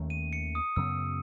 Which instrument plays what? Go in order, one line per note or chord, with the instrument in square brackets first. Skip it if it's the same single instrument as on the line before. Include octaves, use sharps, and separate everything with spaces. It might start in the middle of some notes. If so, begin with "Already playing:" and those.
Already playing: [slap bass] D#2 D#3 A3 C#4
[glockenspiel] D#7
C#7
D#6
[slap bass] F#2 C#3 F#3 B3 [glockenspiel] E6